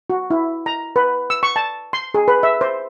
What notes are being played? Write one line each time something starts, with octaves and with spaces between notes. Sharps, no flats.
F#4
E4
A#5
B4
E6
C#6
A5
C6
G#4
B4
E5
C5